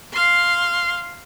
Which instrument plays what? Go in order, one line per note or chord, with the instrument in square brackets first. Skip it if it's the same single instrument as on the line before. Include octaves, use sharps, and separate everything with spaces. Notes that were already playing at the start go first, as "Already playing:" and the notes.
[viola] F5 C6